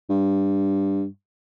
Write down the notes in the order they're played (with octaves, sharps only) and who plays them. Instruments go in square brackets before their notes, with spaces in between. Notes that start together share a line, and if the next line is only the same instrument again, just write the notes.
[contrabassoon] G2